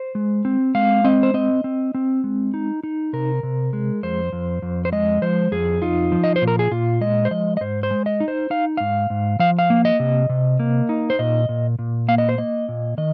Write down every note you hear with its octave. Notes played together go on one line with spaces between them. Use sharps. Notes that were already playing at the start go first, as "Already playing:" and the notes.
Already playing: C5
G#3
C4
G#3 F5
C4 D#5
C5
C4 D#5
C4
C4
G#3
D#4
D#4
C3 A#4
C3
G#3
F2 C5
F2
F2
C5
G#3 D#5
F3 C5
F2 G#4
D#4 F4
F3
D#5
C5
A#2
A#4
G#4
A#2 F4
G#3 D#5
C5
F3 D#5
D#5
G#2 C5
C5
G#3
D#5
D#4
C5
D#4 F5
G#2 F5
G#2
F3 F5
F5
A#3
D#5
C3
C3
A#3
D#4
C5
A#2 D#5
A#2
A#2
A#3 F5
D#5
C5
A#3 D#5
A#2
D#3 D#5